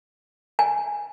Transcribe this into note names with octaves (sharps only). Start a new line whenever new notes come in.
G#5